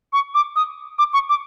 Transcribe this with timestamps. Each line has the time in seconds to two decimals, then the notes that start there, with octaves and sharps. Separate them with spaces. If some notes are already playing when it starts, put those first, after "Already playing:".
0.13 C#6
0.34 D6
0.56 D#6
0.99 D6
1.13 C#6
1.29 D6